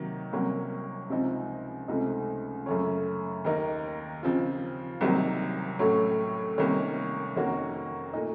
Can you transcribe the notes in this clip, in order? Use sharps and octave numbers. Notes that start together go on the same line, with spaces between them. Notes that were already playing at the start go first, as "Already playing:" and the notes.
Already playing: C3 D#3 F#3 A#3
C2 C3 F#3 A#3 C#4
C#2 C3 F3 C4 D#4
C#2 C3 F3 A3 D#4
F#2 C#3 A3 C#4
D#2 D#3 A#3 D#4
C#3 F3 C4 F4
C2 C3 D#3 F#3 A#3
A2 F#3 A3 C#4
C2 C3 D#3 A#3 C#4
F2 D#3 A#3 C#4 F#4
A#2 A3 D#4